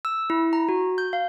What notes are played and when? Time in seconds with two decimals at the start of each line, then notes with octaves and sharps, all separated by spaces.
0.05 E6
0.30 E4
0.53 A#5
0.69 F#4
0.98 G6
1.13 F5